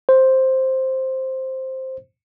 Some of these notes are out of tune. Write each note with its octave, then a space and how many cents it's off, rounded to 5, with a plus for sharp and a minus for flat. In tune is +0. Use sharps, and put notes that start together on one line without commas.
C5 +5